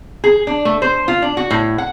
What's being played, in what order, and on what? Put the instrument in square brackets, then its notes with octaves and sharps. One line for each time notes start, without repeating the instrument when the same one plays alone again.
[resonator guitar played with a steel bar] G#4
D4
A3
C5
F4
D4
F#4
A2
F#5